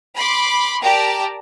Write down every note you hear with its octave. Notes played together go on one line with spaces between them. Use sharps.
B5 C6 D6
G4 A#4 D5 G5 A5 A#5